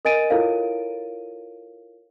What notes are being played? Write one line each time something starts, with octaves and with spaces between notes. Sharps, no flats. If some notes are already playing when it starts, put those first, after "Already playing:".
A#4 D#5 G#5 A6 D7 D#7
E4 F4 A4 A#4 C#5 F5